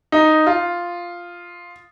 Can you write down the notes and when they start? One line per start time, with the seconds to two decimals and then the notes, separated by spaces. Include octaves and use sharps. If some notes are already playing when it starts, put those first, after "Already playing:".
0.12 D#4
0.47 F4